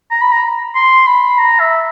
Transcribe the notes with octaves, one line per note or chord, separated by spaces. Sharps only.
A#5
B5
A#5
C6
B5
A#5
E5